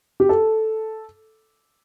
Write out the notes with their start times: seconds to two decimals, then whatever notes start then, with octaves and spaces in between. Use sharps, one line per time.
0.20 G4
0.29 A4